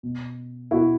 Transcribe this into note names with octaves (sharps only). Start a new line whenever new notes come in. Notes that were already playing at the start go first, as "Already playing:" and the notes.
B2
B2 E4 F#4